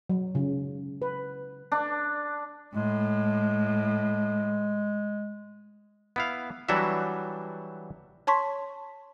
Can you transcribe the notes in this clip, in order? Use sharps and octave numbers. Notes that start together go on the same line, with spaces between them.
F#3
C#3
B4
D4
A2 G#3
B3 E4 F5
E3 F#3 G3 D4 F#4 E5
C#5 A5 C6 C#6 B6